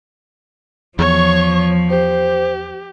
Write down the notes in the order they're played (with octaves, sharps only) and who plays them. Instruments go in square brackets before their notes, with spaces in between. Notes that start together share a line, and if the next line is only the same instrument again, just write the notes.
[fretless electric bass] E2 [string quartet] F3 [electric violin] C#5 C#6
[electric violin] G4 [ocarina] C5